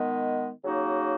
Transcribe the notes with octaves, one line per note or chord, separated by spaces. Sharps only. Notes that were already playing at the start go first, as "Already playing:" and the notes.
Already playing: D#3 G#3 B3
C#3 F#3 A#3 D#4 F#4